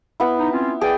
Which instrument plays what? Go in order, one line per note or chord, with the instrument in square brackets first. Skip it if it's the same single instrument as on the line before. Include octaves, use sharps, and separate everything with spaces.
[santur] B3 E4
[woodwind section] D#4
C4 C#4 F4
[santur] G#4 [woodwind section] B4 D5 G5